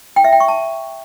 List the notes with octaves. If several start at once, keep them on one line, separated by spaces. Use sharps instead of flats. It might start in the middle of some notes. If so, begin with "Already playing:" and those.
G5
E5
G5
C#6
A5